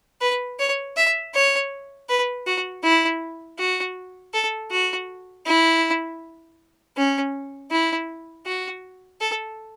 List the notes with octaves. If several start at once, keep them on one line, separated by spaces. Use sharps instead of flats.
B4
C#5
E5
C#5
B4
F#4
E4
F#4
A4
F#4
E4
C#4
E4
F#4
A4